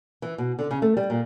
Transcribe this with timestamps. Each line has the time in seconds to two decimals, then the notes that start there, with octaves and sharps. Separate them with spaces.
0.22 E3
0.38 B2
0.59 D3
0.71 C#3
0.82 A3
0.97 G3
1.10 A#2